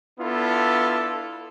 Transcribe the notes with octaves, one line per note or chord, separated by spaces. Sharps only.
B3 D4 E4 F4 A4